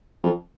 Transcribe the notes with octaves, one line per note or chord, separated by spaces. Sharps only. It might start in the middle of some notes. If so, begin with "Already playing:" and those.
F2